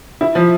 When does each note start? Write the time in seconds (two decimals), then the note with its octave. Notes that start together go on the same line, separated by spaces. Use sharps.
0.21 E4
0.35 F3